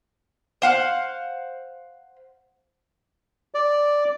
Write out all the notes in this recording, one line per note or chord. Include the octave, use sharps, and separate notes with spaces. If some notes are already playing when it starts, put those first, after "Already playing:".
C5 F5 F#5
D5